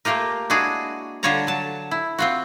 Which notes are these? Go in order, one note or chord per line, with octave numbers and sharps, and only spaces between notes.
A3 A#3 F4 G4 A#4
G#3 D4 E4 F#4 G#4
D3 G3 F4 C#5 A5 A#5
F#3 A5
E4
C4 F4 F#4